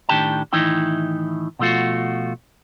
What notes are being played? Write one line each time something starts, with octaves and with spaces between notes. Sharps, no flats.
A2 D#3 D4 G4 G5 A5
A2 D#3 E3 D#4 E4 G5
B2 F3 A3 F4 F#4